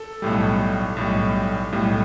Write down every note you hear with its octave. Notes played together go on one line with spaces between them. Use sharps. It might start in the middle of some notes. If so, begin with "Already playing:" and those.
Already playing: A4
B1 A2 G3
B1 A2 G3
B1 A2 G3